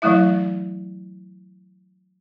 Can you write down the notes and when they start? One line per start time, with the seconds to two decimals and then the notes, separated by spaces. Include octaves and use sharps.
0.02 E3 F#3 A3 E4 E5